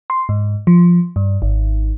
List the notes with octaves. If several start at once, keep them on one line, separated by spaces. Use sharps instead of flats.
C6
G#2
F3
G2
G#1